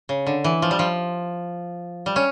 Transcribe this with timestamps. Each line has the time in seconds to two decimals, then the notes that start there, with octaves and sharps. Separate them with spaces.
0.09 C#3
0.27 D3
0.44 E3
0.62 F3
0.71 G3
0.79 F3
2.06 G3
2.16 C#4